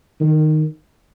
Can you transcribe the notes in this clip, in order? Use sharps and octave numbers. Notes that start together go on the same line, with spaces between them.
D#3